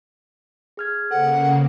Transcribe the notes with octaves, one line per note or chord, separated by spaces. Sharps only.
G#4 F6 G#6
C#3 A#3 A4 C5 F#5